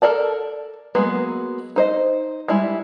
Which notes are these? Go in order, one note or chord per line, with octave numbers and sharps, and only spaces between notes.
A4 A#4 D5 A5
F#3 G#3 A#3 B3
D#4 C5 D#5
G3 G#3 E4